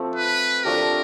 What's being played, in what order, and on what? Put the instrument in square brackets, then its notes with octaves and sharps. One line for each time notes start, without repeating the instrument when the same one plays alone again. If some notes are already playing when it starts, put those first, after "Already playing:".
Already playing: [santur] F3 A3 C4
[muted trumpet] B4
[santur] F3 A3 D4 G4 [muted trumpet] A#4